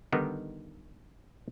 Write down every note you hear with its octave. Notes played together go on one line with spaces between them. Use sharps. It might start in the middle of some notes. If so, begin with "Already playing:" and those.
D3 D#3 G3 B3 D#4